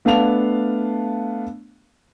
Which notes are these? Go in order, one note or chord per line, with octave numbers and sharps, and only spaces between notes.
A3 B3 D4 F5 A5 F7